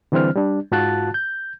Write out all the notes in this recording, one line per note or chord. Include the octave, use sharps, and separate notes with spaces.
D3 E3 G3 C4 C5 F6
G3 D4
G#2 F4 F#4 A5 F#6 A6
G6